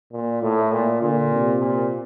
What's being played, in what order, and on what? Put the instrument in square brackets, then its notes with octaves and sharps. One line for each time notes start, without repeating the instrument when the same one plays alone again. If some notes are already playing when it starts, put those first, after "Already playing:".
[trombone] A#2
[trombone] A2 [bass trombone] A3
[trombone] A#2
[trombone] A#2 [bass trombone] D3
[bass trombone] C3
[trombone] A#2